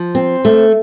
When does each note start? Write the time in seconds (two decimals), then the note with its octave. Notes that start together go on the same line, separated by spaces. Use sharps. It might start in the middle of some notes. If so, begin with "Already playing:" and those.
Already playing: F3
0.15 C4
0.45 A3